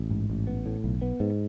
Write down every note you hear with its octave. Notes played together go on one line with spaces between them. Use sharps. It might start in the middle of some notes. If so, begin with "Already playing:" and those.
Already playing: A1
G#2
A1
B3
A2
B1
B3
G#2